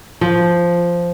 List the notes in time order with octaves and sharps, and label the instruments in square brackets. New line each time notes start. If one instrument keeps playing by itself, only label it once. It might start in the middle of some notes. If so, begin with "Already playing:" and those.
[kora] F3